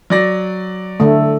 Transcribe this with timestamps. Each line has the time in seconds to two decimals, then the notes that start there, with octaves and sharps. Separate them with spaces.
0.10 F#3 D5 A#6
1.00 D3 A3